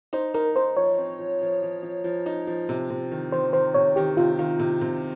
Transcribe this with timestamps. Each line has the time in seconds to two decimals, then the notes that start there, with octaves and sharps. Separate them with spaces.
0.13 D#4 C5
0.34 D#4 A#4
0.56 D#4 C5
0.77 F3 C#5
0.98 C4
1.19 F3
1.41 F3
1.63 F3
1.83 F3
2.04 F3
2.26 D#4
2.47 F3
2.69 C3
2.90 C3
3.12 D#3
3.32 D#3 C5
3.53 D#3 C5
3.74 C3 C#5
3.96 D#3 G4
4.17 C3 F4
4.39 D#3 F4
4.59 C3
4.81 C3